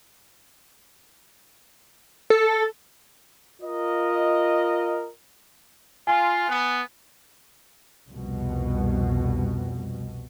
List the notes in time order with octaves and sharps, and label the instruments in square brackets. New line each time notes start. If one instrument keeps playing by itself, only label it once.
[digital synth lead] A4
[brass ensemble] F4 A#4 D#5
[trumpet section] F4 [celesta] G#5
[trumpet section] B3
[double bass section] C2 F2 B2